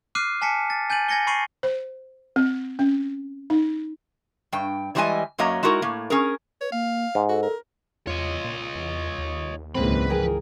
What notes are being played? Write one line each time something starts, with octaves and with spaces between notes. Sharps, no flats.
D6 F6 F#6 C7 D#7
G#5 A5 B6 C#7
A6
G#5 G6 A6 D#7 F#7
G#5 G#6 A#6 C#7 G7
B5 C#6 C7 D#7 F#7
C5
C4
C#4
D#4
G2 G5
E3 G3 G#3 D4 D#5 G#5
F#2 F#3 A#3 D#5 A#5
G#3 D#4 E4 F#4 A#4
A2 A#3
C#4 G#4 A#4
B4 C#5
A#3 F5
G#2
F#4 A4
A#4
E2 F4 C#5 D#5
A#2
E2
D#2
C#2 G#2 E3 G#3 A#3 C4 B4 B5
F3 G#4 A#4 G5